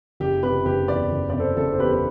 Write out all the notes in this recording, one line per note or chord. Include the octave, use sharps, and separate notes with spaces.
F#1 G4
C3 G4 B4
F#1 G4 B4
E2 B4 D5
F#1
C3 D5
A4 C5
F#1 A4
C5
E2 G4 B4
B4